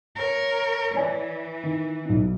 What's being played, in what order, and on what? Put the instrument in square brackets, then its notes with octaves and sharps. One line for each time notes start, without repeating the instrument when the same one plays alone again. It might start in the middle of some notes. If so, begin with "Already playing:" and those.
[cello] A#4 C#5
[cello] E3 [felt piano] C#5 D5 G#5
[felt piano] D#3
B1 D#4